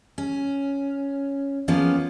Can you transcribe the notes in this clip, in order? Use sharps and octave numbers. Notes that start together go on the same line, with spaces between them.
C#4
F3 A#3 B3 C#4